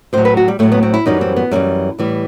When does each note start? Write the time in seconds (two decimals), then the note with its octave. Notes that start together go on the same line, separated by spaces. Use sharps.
0.13 A2 F#3 C5
0.25 B4
0.37 F#4
0.48 G3
0.59 A2 F#3 A3
0.72 B3
0.83 C4
0.94 E4
1.06 F#2 E3 G3 D#4
1.21 C4
1.36 B3
1.51 F#2 E3 G3 A3
1.98 A2 E3 G3